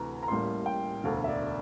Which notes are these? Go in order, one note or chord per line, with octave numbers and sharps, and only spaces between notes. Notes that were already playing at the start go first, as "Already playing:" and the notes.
Already playing: D2 C3 E3 A#5
A#5
A1 A2 G3 A#3 C6
G5
E1 D2 D3 F5
E5
D5